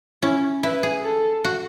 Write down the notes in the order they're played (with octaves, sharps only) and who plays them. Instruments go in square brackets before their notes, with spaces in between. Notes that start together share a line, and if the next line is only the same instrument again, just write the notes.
[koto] C#4 [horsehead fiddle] E4
[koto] E4 [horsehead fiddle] B4
[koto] G#4
[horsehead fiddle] A4
[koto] F#4